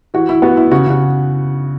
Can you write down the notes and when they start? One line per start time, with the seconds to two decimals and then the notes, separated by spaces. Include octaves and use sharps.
0.14 E3 F#4
0.29 E3 E4
0.42 B3 F#4
0.57 E3 E4
0.71 C#3 F#4
0.86 C#3 F#4